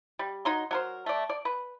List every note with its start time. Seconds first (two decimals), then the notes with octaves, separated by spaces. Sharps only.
0.19 G3
0.45 F#3 D#4 C6
0.71 F#3 A#4 C5
1.06 A3 D5
1.29 D5
1.45 B4